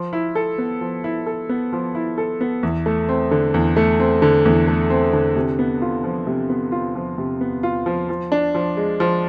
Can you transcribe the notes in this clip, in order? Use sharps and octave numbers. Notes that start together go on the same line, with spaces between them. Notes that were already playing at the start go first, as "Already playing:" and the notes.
Already playing: F3
E4
A4
B3
F3
E4
A4
B3
F3
E4
A4
B3
E2
A3
C4
D3
E2
A3
C4
D3
E2
A3
C4
D3
C3
B3
F4
F3
C3
B3
F4
F3
C3
B3
F4
F3
F3
D4
F3
G#3
F3